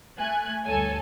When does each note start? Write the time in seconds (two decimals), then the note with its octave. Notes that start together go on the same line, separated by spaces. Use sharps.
0.19 A3 G#5 F#6
0.65 D2 G2 A4 C#5 G#5